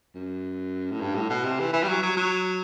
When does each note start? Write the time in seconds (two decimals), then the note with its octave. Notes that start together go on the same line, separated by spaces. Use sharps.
0.14 F#2
0.91 A2
1.01 G2
1.16 A2
1.30 B2
1.44 C3
1.60 E3
1.73 E3
1.83 G3
1.88 F#3
2.03 F#3
2.17 F#3